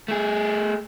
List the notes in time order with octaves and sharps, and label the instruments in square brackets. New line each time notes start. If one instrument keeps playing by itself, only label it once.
[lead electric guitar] A3 G#4